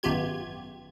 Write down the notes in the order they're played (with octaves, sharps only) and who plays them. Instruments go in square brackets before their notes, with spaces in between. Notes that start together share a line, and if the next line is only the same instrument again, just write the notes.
[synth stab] G#1 F#2 B3 F4 G4 G#6